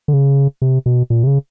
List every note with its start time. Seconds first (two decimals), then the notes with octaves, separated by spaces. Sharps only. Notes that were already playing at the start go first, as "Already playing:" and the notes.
0.08 D3
0.13 C#3
0.62 C3
0.86 B2
1.10 A#2
1.24 C3
1.27 C#3